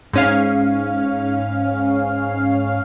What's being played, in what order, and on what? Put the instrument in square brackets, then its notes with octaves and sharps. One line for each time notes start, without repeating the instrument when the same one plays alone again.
[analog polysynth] G#2 C#4 F5